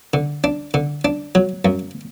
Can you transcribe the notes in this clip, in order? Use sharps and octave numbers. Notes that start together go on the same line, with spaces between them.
D3
D4
D3
D4
F#3
F#2